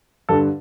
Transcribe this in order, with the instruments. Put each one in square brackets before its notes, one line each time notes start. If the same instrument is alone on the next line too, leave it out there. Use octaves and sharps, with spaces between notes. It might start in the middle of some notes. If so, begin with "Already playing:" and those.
[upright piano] G2 D3 A4